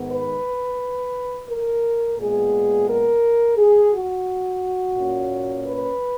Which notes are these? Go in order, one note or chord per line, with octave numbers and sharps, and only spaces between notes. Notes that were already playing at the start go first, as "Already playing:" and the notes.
Already playing: G#2 D#3 G#3 B3
B4
A#4
A#2 G#3 B3 G#4
A#4
G#4
F#4
A#2 A#3 C#4
B4